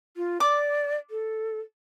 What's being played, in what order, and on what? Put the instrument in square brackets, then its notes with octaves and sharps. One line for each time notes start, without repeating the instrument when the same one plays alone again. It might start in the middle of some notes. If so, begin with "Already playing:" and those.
[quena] F4
[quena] D5 [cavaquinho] D6
[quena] A4